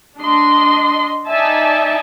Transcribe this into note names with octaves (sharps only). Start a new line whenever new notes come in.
D4 D#5 C6
D#4 D5 E5 G#5 A5